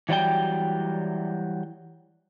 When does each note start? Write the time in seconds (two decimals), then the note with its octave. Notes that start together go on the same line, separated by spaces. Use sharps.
0.09 E3 F#3 G3 D5 G5